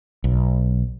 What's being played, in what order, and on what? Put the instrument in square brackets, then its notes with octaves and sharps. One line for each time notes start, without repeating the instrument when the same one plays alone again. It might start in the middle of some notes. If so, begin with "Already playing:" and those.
[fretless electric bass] B1